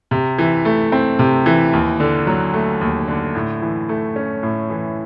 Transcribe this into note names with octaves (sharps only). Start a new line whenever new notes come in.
C3
E3
A3
C4
C3
E3
D#2
D3
F#3
A3
D#2
D3
A2
E3
A3
C#4
A2
E3